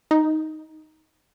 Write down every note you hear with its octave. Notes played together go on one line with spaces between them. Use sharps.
D#4